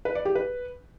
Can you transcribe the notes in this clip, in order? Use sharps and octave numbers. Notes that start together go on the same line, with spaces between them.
B4
D5
G4
B4